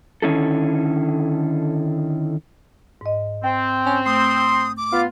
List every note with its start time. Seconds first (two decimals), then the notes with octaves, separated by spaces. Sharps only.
0.22 D3 D#3 C#4 E4 A4
3.01 G#2 D#5
3.44 C4 G5
3.86 C#4
4.06 A3 C6 D#6
4.77 D6
4.92 B3 F4 F5